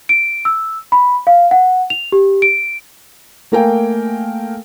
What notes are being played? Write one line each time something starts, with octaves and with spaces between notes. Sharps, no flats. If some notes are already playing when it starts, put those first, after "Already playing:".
D7
E6
B5
F5
F#5
F7
G4
D7
A3 A#3 A#4 F5 G5 G#5